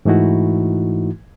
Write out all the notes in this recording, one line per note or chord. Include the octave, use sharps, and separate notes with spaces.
G#2 E3 A3 D#4 E4 F#4